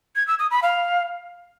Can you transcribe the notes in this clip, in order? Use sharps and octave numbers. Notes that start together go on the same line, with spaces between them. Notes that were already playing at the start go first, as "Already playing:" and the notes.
G#6
E6
D#6
B5
F5